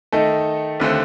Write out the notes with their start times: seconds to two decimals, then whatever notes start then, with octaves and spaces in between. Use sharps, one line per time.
0.12 D#3 A3 D#4 A4
0.80 D#2 D3 A3 C4